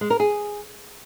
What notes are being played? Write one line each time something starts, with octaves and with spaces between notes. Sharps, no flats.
G#3
A#4
G#4